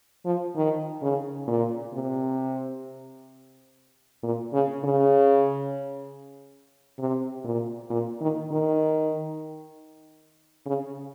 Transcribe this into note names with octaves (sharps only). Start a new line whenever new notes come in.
F3
D#3
C#3
A#2
C3
A#2
C#3
C#3
C3
A#2
A#2
D#3
D#3
C#3